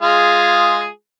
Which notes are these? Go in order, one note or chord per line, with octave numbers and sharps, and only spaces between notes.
G#3 F4 G#4